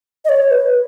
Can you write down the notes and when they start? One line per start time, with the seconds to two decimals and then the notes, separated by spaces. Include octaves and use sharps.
0.25 D#5
0.29 C#5
0.51 B4